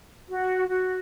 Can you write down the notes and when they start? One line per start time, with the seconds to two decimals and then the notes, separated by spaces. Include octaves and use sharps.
0.29 F#4
0.69 F#4